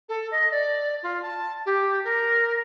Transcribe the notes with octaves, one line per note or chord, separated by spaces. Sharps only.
A4
D#5
D5
F4
A5
G4
A#4